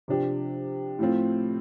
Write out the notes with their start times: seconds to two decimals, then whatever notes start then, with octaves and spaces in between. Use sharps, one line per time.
0.08 C3 F3 D4 G4
0.99 A2 F3 A3 C4 F4